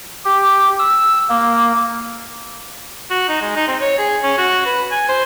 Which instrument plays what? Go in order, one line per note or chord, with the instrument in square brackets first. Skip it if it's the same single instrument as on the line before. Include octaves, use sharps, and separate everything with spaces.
[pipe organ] G4
E6
A#3
[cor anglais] F#4
D#4
G#3
D#4
C4
C#5
G#4
C#4
F#4
B4
G#5
C5